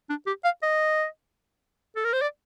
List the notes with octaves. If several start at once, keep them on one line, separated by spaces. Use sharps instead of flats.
D4
G4
F5
D#5
A4
A#4
C5
D5